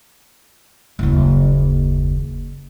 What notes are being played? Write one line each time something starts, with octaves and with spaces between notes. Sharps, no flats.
F#1 D#2